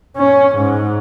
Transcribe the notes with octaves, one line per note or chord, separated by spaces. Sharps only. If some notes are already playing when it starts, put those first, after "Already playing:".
C#4
G#2